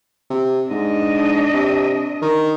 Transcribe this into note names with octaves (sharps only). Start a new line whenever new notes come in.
C3
G#2 D4 D#5
C3
D#3